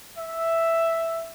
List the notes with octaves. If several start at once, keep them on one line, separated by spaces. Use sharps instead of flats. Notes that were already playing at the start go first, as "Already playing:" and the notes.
E5